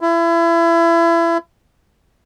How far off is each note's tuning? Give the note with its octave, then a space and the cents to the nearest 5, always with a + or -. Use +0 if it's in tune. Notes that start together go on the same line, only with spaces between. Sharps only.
E4 +30